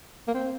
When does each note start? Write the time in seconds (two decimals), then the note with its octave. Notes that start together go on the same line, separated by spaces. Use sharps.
0.28 A#3
0.34 C4